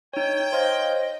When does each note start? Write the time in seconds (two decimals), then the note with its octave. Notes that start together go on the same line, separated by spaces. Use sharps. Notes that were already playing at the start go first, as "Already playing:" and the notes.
0.13 D#4 C#5 G5
0.53 C5 D#5 F5